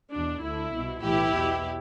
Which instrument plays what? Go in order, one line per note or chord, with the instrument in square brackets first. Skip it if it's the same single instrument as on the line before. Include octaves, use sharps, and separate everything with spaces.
[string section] E2 B2 D4
D2 D3 E4
C2 B2
B1 A2 E3 E4 G4
E2 B2